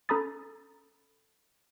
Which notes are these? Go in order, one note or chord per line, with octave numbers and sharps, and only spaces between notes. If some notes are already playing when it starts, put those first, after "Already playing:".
C#4 A4 A#5 B5 D#6 A6